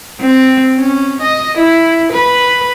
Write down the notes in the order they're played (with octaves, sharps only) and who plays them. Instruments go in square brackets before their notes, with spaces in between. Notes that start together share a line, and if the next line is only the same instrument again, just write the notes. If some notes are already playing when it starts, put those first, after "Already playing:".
[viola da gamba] C4
C#4
D#5
E4
B4